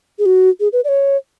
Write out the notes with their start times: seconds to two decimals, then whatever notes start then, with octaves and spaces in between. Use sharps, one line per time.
0.19 G#4
0.26 F#4
0.60 G#4
0.73 B4
0.84 D5
0.89 C#5